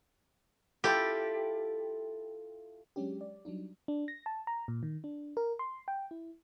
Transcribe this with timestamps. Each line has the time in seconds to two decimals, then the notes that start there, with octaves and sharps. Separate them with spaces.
0.84 E4 F4 G4 A4
2.96 F#3 G#3 C#4 D4 G4
3.21 D5
3.45 F#3 G3 D4 D#4
3.88 D4
4.08 A#6
4.26 A5
4.47 A#5
4.68 A#2
4.83 D#3
5.04 D4
5.37 A#4
5.59 C6
5.88 G5
6.11 E4